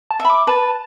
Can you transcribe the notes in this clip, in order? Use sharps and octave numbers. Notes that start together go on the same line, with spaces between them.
A5
E5
B5
D6
B4 A5